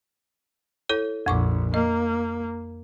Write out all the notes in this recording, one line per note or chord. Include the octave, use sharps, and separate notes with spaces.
E4 A4 C#5
A#1 F2 C#6 D6
A#3 D#5